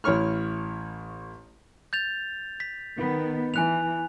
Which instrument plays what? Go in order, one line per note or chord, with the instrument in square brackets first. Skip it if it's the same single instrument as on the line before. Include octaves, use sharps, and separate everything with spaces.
[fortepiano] A1 E4 C#5 C#6 F6
[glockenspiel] G6 A6 F7
B6
[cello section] D#3 B3
[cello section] E3 [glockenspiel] G#5 F#6 F7